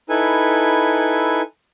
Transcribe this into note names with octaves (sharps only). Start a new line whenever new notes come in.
D#4 E4 A4 B4 G#5